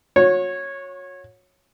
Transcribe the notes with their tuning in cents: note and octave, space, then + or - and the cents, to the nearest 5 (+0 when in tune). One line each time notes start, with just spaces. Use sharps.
F#4 -35 C#5 -10